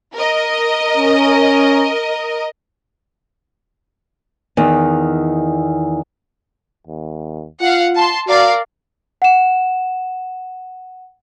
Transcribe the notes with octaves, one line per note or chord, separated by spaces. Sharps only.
A#4 D#5
C#4
E2 D#3
D#2
F4 F5 F#5
A5 C6
F#4 A#4 D5 F5
F#5 E7